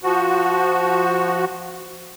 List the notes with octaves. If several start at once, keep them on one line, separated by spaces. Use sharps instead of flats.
F3 F#4